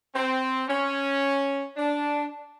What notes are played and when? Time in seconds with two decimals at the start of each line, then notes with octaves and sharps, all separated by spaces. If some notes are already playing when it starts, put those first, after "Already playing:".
0.15 C4
0.68 C#4
1.76 D4